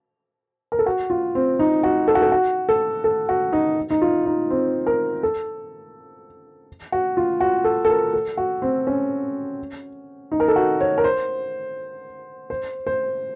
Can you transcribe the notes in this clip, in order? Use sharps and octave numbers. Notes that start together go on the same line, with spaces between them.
A#4
A4
F#4
F4
C4
D#4
F#4
A4
F#4
A4
F#4
A4
A4
F#4
D#4
D#4
F4
D#4
C4
A#4
A4
F#4
F4
F#4
A4
A4
A#4
A4
F#4
C4
C#4
D#4
A#4
A4
F#4
C#5
A#4
C5
C5
C5